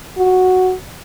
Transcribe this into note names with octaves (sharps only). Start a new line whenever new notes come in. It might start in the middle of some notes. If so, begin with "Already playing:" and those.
F#4